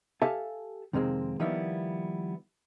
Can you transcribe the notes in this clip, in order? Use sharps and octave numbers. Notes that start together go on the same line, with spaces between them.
G4 A4 E5 F5 G#5 A5
F2 C3 D#3 G#3 A#3 C4
D#3 F3 G3 A#3 B3 E4